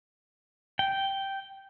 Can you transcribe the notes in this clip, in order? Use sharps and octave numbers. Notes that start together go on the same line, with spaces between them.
G5